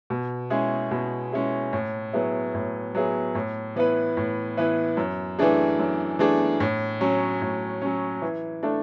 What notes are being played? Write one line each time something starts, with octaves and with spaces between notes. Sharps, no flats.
B2
G#3 C#4 E4 G#4
B2
G#3 C#4 E4 G#4
A2
F#3 B3 E4 G#4
A2
F#3 B3 E4 G#4
A2
E3 B3 E4 B4
A2
E3 B3 E4 B4
F#2
E3 A3 D4 G#4
F#2
E3 A3 D4 G#4
A2
F#3 C#4
A2
F#3 C#4
E3
A3 D4 A4